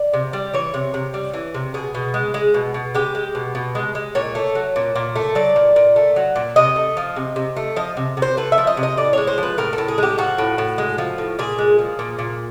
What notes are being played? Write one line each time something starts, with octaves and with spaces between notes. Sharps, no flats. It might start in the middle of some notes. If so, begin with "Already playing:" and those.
Already playing: D5
C3
G3
E3 C#5
C3
C3
G3
E3
C3
B2 G#4
B2
G#3
G#3
B2
B2
G#3 G4
G#3
B2
B2
G#3
G#3
A#2 C#5
A3
F#3
A#2
A#2
A3
F#3 D5
A#2
A#2
A3
F#3
A#2
C3 D#5
A3
F3
C3
C3
A3
F3 D#5
C3
C3
C5
A3 B4
E5
F3
D#5
C3
D#5
A2 D5
G#3 C#5
C5
F3 B4
A2 A#4
A4
A2
G#4
G#3 G4
F3 F#4
A2
A2
G#3
F3
A2
A#2 G#4
G#3
F3
A#2
A#2